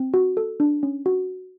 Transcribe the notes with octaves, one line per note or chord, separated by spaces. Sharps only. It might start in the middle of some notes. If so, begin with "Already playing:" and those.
Already playing: C4
F#4
A4
D4
C#4
F#4